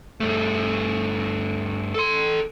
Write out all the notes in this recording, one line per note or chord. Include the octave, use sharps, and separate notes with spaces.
G2 A3
A4 C6